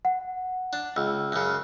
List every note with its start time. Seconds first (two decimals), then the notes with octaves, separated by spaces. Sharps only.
0.05 F#5
0.73 D4
0.96 C#2 E6
1.32 F#2 C#3